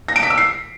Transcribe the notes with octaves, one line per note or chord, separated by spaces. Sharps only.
A#6
D7
B6
E6
C7